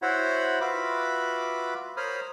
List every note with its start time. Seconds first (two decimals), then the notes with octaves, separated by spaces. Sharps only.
0.02 E4 F#4 C5 C#5 F#5 B5
0.61 F4 F#4 B4 E5 B5 D6
1.97 A#4 C5 C#5 B5 D#6 F6